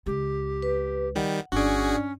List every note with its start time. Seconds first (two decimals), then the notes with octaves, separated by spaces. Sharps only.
0.06 C#2 G#3 G4
0.62 B4
1.15 D#3 G3 F#5
1.52 G1 C#4 D4 F#4 G#4 D5